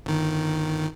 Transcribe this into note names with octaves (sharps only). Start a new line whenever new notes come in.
G1 D#3